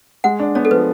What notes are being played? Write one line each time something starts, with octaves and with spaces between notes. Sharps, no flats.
G#3 F#5
D4
B3 C#5
A4
F3 B4